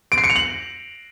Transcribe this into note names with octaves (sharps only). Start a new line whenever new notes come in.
D7
C7
C#7
F7
F#7